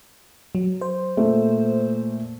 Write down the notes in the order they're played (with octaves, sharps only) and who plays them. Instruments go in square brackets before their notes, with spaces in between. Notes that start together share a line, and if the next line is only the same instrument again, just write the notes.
[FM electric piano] F#3
C5
[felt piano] A#2 A3